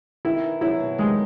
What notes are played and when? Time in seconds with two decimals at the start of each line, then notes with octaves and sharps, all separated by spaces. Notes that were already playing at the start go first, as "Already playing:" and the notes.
0.25 D#3 E4
0.44 E3
0.61 F#3 E4
0.80 B2
0.98 D#3 G#3